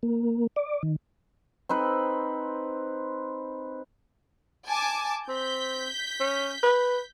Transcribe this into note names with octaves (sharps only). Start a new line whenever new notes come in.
A#3
D5
D#3
C4 D#4 B4 C5
G#5 A5 D6
C4 G6 B6
C#4
B4